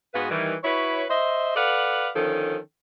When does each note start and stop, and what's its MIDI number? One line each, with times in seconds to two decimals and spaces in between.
0.13 0.29 44
0.13 0.29 59
0.13 0.29 66
0.13 0.29 68
0.13 0.29 71
0.13 0.29 77
0.30 0.53 51
0.30 0.53 52
0.30 0.53 55
0.64 1.04 64
0.64 1.04 66
0.64 1.04 71
0.64 1.04 73
1.09 1.56 72
1.09 1.56 75
1.09 1.56 76
1.56 2.08 69
1.56 2.08 71
1.56 2.08 74
1.56 2.08 77
1.56 2.08 78
2.15 2.57 50
2.15 2.57 51
2.15 2.57 53
2.15 2.57 61
2.15 2.57 69